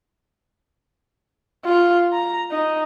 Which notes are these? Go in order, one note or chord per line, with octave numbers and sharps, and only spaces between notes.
F4
A#5
D#4